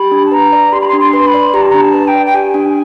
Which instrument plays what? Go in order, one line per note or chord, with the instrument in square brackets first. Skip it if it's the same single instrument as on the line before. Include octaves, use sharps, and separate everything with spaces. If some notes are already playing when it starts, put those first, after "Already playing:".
Already playing: [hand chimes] G4 [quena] B5
[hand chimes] D4
[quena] A5
[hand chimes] B4 [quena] A#5
[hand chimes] D5
[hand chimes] G4 [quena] C6
[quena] B5
C6
[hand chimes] D4
[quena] C6
[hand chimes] B4
[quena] B5
[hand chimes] D5
[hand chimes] G4 [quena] A#5
[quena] A5
A#5
[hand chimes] D4
[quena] A5
[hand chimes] B4
[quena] G5
[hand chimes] D5
[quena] G5
[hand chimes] G4 [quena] G#5
[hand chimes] D4